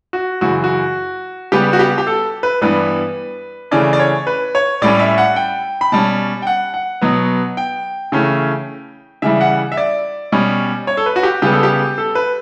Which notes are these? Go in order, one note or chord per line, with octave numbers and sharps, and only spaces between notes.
F#4
F#2 C#3 E3 F#4
F#4
C#3 G3 B3 G4
F#4
G4
G4
A4
B4
G2 E3 G3 B3 B4
C#3 E3 A3 C#4 D5
D5
C#5
B4
C#5
A2 G3 C#4 D5
E5
F#5
G5
B5
B2 G3 C#4 A5
G5
F#5
F#5
B2 F#3 B3
G5
C#3 E3 A3 C#4
C#3 E3 G3 E5
F#5
E5
D5
B2 G3 C#4
C#5
A4
B4
F#4
G4
C#3 G3 B3 G4
A4
G4
A4
B4